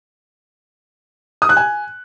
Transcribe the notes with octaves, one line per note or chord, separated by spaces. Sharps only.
D#6
F#6
G#5